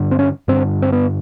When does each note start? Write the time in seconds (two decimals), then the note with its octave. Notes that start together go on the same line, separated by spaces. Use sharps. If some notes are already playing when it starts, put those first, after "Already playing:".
Already playing: G2 D3
0.11 C4
0.19 C#4
0.48 G2 D3 C4
0.82 C4
0.92 B3